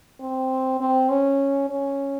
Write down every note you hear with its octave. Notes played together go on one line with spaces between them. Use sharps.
C4
C4
C#4
C#4